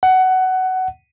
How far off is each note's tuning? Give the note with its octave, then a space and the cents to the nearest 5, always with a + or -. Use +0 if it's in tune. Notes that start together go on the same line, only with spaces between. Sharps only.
F#5 +15